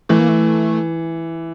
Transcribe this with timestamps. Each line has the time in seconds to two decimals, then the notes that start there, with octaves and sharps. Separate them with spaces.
0.09 E3 A3
0.19 A#3
0.29 A3